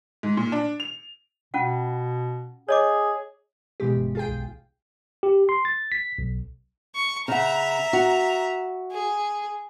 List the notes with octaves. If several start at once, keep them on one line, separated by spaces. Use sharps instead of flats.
G#2
A#2
D4
F7
B2 C#4 F4 F#5
G#4 C#5 D#5 D6
B2 E3 G#3 G4
G1
F4 G#4 G5
B1
G4
C6
A6
B6
B1
C#6
C#3 E5 F#5 A#5
F#4
G#4